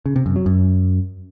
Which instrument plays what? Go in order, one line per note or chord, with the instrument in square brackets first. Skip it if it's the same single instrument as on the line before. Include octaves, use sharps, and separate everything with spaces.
[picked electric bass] C#3
C3
F#2
F#3
F#2